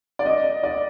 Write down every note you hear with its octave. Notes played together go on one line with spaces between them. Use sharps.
D5
D#5
D5